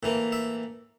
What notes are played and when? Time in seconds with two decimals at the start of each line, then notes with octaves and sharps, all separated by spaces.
0.03 A2 E3 A#3
0.32 E5